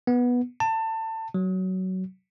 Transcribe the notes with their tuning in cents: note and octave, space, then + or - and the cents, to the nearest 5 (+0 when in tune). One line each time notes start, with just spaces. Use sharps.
B3 -10
A5 +25
F#3 +15